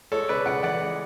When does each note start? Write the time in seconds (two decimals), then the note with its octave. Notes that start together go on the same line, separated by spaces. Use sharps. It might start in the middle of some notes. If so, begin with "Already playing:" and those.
0.12 G#3 A4 C#5
0.29 C#3 B4 D5
0.46 C#3 D5 F#5
0.63 E3 D5 F#5
0.81 G#3